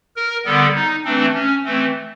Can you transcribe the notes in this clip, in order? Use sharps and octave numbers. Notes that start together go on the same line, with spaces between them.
A#4
D3 G3 B3 A4
D#4
E3 A3 C4 D4
C#4
E3 A3 C4